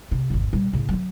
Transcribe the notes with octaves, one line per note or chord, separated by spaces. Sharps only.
C3
G#1 E2
A#2 G3
A2 C#3
F#3 C4